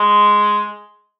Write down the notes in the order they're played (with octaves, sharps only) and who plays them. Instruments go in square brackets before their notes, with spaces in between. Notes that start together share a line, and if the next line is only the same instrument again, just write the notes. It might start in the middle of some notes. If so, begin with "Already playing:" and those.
Already playing: [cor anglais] G#3